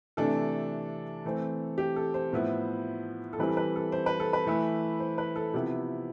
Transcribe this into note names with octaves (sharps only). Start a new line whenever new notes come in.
C3 E3 A3 D4 A4
E3 A3 C4
G4
A4
C5
A2 F3 B3 E4
A4
E3 G3 C4 E4 B4
A4
B4
A4
C5
B4
A4
B4
E3 A3 E4
C5
B4
A4
C3 F3 B3 E4 G4